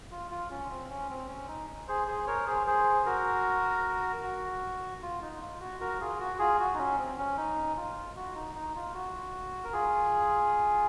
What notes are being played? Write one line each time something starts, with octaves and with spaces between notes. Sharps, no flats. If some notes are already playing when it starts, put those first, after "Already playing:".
F4
F4
C#4
C4
C#4
C4
C#4
D#4
G#4 C5
G#4 C5
A#4 C#5
G#4 C5
G#4 C5
F#4 A#4
F#4
F4
D#4
F4
F#4
F#4 A#4
F4 G#4
F#4
F4 G#4
F#4
D#4
C#4
C4
C#4
D#4
F4
F#4
D#4
D#4
F4
F#4
A#4
F4 G#4